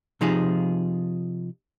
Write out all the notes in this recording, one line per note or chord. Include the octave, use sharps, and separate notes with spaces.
C3 F3 D#4 F4 G#4